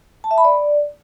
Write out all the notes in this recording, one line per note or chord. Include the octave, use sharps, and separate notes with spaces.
A5
E5
B5
D5